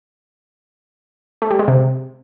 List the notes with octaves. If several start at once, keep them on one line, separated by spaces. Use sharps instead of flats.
A3
G3
G#3
C3